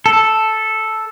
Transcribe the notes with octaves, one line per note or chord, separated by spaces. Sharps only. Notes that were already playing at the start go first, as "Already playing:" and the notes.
A4